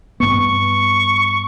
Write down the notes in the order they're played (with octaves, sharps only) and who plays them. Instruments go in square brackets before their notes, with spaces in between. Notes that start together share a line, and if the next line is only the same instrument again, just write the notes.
[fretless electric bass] G2 B3 [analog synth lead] C#6